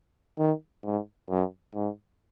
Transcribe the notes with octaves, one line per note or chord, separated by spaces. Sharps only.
D#3
G#2
F#2
G#2